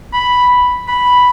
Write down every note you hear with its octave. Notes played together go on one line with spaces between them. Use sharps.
B5
B5